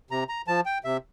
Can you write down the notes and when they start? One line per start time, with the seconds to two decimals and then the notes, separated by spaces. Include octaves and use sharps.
0.11 C3 A#5
0.29 A#5
0.47 F3 A5
0.65 G5
0.84 C3 E5